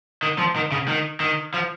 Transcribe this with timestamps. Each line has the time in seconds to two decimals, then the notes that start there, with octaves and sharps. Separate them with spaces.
0.23 D#3
0.38 F3
0.56 D#3
0.72 C#3
0.88 D#3
1.20 D#3
1.54 F3